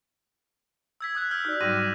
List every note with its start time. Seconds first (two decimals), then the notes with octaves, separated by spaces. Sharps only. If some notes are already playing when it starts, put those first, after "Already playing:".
1.01 E6 G#6 B6
1.15 D#6 F#6 G#6
1.31 E6 F6 G6
1.45 D#4 F#4 D5
1.61 G#2 F#3 G3 D6 A#6 D#7